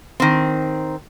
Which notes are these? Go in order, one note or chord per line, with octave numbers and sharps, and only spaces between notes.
D#3 C4